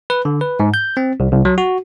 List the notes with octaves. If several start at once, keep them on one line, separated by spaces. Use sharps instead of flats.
B4
D3
B4
G#2
G6
C4
C2
C2
F#3
F#4